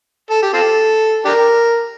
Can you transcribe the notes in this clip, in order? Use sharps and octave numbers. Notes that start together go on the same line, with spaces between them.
A4
G4
C4 F4 A4
D4 G4 A#4